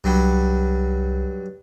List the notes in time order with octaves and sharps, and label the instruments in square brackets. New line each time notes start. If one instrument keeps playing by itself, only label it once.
[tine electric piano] C2 [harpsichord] G2 F#3 G3